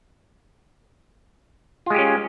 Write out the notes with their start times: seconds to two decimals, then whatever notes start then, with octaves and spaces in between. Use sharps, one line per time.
1.86 F4
1.90 G#3
1.94 G4
1.98 C#4